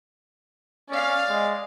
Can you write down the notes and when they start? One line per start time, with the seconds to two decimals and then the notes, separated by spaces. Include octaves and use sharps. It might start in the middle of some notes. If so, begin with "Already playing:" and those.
0.89 C#4 D5 F5
1.29 G#3